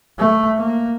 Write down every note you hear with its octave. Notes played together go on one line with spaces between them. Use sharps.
A3
A#3